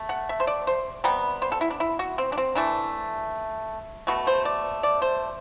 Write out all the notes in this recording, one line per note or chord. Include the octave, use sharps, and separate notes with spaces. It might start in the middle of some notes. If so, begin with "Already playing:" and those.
Already playing: A3
F#5
E5
C5
D5
C5
C3 G3 B3
C5
A4
E4
D4
E4
F#4
C4
D4
C4
E3 A3 D4
B2 A3 F#4
C5
D5
D5
C5